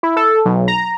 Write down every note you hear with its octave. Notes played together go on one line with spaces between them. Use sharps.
E4
A4
B1
A#5